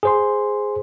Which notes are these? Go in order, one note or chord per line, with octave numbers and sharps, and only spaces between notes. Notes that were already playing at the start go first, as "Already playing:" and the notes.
G#4 C5 C6